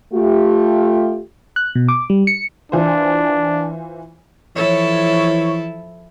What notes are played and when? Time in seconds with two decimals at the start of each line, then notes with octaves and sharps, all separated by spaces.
0.14 A3 F4 G4
1.56 F#6
1.75 B2
1.89 D6
2.10 G3
2.27 C#7
2.72 E3 D4 F4 C5
4.56 E3 F3 E4 A4 C#5